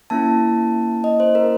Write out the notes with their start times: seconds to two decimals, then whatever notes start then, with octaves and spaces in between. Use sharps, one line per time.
0.10 A#3 C#4 E4 A5
1.04 D#5
1.20 C5
1.35 A#4